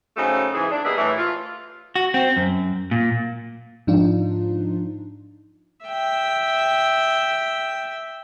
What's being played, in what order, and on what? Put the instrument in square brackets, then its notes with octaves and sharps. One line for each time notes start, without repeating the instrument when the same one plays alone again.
[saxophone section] C#3 F#3 A3 C4 C#4 D#4
G#2 E3 G#4
D4
G3 A#3 B3 G#4 D#5 E5
A2 E3
F4
[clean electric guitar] F#4
C4
F#2
A#2
[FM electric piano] G#2 F3 D4 D#4 F4
[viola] E5 G5